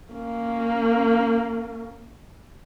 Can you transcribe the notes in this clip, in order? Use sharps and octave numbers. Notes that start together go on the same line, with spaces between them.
A#3 C#4